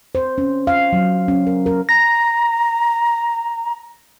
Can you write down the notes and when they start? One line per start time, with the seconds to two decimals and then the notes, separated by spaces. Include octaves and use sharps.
0.15 C5
0.38 C#4
0.67 F5
0.93 F#3
1.28 C#4
1.47 A#4
1.66 A#4
1.89 A#5 A#6